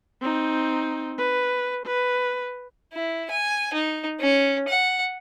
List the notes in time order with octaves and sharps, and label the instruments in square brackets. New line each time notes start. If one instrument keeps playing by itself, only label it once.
[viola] C4 D#4
B4
B4
[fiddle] E4
G#5
D#4
C#4
F#5